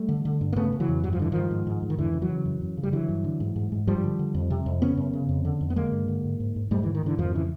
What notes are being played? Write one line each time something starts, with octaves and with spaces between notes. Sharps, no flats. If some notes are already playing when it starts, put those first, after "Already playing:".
Already playing: G3 A3
D3
D3
G2
A#3
C#3 A3 B3
C#3
E3 F#3
F2
G2 F#3
F3
D3 E3
G2 D#3 F3
G#2
G#2
G#2
D#3
F2 D3 E3
C#3
E3 F#3
C#3
F#2
F#2
C#3
G3
D3 E3 F#3
G2
D3
G#2
G#2
G#2
G2 F3 G3
D3
D3
F2
C3
F2
C#3 B3 C#4
F#2
C#3
F2
D3
F2
B3
D3 G#3 A#3
G2
D3
G#2
G#2
G#2
G#2 G3 A3
G#2 D3 E3
D#3
G#2 D3 E3
F2 D#3 F3
C#3 E3